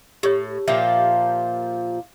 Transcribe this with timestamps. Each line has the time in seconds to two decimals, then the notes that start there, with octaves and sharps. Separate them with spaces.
0.23 A2 G4 C#5
0.68 A#2 F3 G4 E5